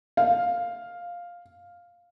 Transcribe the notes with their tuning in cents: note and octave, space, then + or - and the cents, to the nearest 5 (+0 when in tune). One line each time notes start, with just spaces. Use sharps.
F5 +5